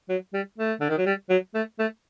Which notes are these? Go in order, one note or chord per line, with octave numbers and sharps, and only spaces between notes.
F#3
G3
A3
D3
D#3
F#3
G3
F#3
A3
A3